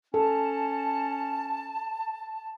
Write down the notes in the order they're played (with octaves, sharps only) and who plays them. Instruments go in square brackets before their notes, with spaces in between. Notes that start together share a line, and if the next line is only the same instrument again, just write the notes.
[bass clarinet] C#4 [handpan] A4 [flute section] A5